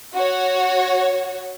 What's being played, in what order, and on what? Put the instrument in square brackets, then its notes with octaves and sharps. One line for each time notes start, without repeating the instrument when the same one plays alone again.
[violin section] F#4 C#5